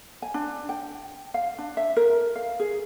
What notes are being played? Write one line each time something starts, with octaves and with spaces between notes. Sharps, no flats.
G#5
D4
G5
F5
D4
E5
A#4
F5
G#4